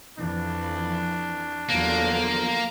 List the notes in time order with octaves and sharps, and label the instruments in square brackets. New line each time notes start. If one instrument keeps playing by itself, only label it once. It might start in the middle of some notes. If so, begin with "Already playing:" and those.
[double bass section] F2 E3 [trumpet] D4
[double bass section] E2 F#3 [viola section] D3 F3 [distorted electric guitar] A#3